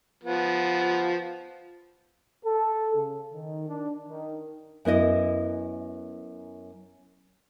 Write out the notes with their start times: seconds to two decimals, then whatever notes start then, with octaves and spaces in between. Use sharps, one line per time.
0.24 F3 B3
2.45 A4
2.94 C#3
3.33 D#3
3.68 D4
4.09 D#3
4.85 F#2 B3 E4 D#5